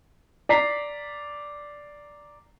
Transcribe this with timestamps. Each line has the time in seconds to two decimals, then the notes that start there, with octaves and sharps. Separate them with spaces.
0.49 D5 A#5 B6 C7